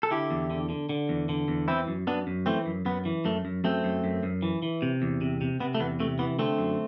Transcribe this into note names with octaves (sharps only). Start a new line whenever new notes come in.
A4
D3 E4 G4
E2
D3
D3
D3
E2
D3
E2
E3 C4 E4
F#2
F#2 B3 D4
F#2
E3 A3 C4
F#2
F#2 B3
E3
F#2 A3
F#2
F#2 A3 C4
F#2
F#2
F#2
E3
E3
C3
E2
C3
C3
C3 B3
A3
E2 B3
C3 A3
E3 B3
D3 A3 C4
F#2